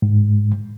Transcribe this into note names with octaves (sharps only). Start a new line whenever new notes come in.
G#2